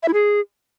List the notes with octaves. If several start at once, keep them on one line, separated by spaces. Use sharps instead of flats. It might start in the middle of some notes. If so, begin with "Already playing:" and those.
E5
E4
G#4